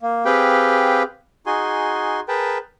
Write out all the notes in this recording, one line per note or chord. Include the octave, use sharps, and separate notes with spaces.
A#3
C4 G4 G#4 B4 F5 G5
D#4 F#4 G#4 G#5 C6
G#4 A#4 B4 G5 A5